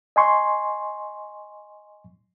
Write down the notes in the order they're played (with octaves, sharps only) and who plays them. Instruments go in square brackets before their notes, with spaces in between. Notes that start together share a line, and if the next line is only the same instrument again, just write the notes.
[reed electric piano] D#5 G#5 C6 C#6